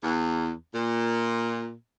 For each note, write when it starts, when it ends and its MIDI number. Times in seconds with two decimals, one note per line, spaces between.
0.03 0.50 40
0.73 1.73 46